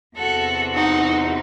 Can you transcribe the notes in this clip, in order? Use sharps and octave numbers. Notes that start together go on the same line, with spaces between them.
E2 C3 E3 F#4 A4
D#4 F#4